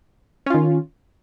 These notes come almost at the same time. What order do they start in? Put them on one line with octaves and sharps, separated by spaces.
C#4 F4 D#3